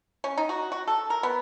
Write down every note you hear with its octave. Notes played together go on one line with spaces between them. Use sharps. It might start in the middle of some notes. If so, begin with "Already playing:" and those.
C#4
D#4
F#4
F#4
A4
A#4
B3